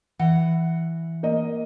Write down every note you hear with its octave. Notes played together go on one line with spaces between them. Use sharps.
E3 F#5
A#3 D#5